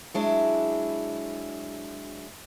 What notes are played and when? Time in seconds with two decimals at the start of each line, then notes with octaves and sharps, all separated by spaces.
0.14 F#3 G#3 D4 E4